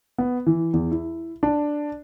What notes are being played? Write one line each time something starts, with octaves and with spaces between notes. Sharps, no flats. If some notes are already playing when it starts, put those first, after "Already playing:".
B3
E3
E2
E4
D4